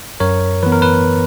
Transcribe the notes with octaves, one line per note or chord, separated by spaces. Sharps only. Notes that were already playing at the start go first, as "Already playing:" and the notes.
F#2 A#4 C#5
E3 B3 B4
A#4
B4